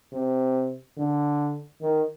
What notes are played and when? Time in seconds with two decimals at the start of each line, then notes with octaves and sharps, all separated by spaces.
0.13 C3
0.98 D3
1.82 D#3